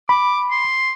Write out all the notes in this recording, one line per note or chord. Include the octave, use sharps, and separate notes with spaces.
B5 D6
C6